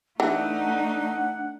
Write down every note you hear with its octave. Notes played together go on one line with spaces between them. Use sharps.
E3 A3 D4 D#4 F#5